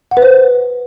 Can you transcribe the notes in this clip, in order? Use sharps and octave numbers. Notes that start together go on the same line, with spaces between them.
F#5
B4
C5